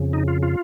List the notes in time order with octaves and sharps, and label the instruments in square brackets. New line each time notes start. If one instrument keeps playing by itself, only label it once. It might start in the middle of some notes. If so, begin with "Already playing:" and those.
Already playing: [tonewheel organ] F2 C#3
D#4
F4
F4